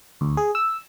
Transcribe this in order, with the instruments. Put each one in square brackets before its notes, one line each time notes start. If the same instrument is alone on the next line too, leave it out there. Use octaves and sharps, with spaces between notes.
[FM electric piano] D2
G#4
E6